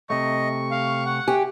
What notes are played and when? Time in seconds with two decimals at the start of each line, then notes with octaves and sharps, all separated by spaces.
0.10 C3 A3 D#5 C#6
0.71 F5
1.06 F#5
1.28 G4 G#5